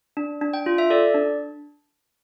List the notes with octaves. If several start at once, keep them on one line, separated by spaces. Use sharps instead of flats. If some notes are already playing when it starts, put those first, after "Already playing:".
D4
D4
G5
F4
E5
A4 D5
D4